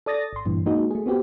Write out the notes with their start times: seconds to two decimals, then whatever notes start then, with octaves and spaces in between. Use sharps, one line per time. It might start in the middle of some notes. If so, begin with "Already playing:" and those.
0.06 A4 D5 D#6 A6 A#6
0.33 G#1 C6
0.46 G2 A#2 E3
0.66 G#3 A#3 D#4 F#4
0.91 A3 G#4
1.06 B3 C4 F#4 G4